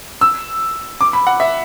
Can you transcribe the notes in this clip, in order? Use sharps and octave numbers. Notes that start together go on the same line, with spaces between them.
E6
D6
B5
F#5
E5